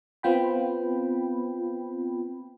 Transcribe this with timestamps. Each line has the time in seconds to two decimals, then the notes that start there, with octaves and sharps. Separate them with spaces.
0.23 B3 C4 F4 G5 B5